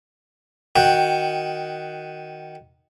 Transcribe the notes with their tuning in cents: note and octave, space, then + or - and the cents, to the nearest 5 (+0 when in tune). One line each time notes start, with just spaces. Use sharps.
D#3 +0 F#4 +0 G5 +5